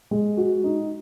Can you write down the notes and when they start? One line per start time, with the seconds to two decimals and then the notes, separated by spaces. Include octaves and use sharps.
0.11 G#3
0.37 F#4
0.64 D#4